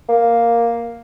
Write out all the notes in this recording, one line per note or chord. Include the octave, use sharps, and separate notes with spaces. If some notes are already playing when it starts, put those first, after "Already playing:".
A#3